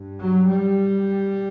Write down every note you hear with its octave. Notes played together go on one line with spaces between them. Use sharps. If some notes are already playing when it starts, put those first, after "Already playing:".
Already playing: G2
F#3
G3